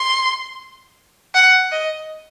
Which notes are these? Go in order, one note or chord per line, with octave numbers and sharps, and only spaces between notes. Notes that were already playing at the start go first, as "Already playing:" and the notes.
Already playing: C6
F#5
D#5